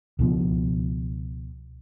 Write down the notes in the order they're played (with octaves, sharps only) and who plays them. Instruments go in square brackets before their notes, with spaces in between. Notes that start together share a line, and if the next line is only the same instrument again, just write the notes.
[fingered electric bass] C#2 B2 F3